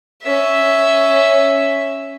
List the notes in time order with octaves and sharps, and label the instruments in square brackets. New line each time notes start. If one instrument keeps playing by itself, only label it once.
[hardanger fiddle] C#4 E5